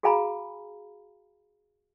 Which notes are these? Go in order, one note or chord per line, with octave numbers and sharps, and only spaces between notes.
F#4 G#4 F5 G#5 A#5 B5